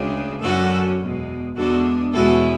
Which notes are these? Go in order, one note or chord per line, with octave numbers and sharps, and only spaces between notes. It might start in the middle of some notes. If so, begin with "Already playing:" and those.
Already playing: D2 C#3 G#3 D4
F#2 D3 F#3 C#4 F#4 A4
E2 B2 G#3
E2 D3 G#3 B3 D4 F#4 A4
E2 B2 G#3 C#4 E4 F#4 A4